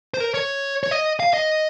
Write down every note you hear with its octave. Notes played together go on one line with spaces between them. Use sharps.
C5
A#4
C#5
C#5
D#5
F5
D#5